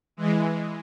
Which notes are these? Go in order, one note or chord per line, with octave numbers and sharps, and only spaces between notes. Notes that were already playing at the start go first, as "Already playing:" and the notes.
E3 G#3